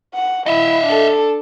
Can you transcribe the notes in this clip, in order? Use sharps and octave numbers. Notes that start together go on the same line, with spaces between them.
F#5
E4 D#5 E5
D4 A4